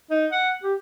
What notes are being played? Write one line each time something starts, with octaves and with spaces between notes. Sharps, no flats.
D#4
F#5
G4